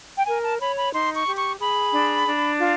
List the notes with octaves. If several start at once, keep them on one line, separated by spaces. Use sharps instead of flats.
G5
A#4 G#5
A5
C#5 B5
B5
D#4 C6
C#6
G4
C#6
G#4 B5
D4
D4
F4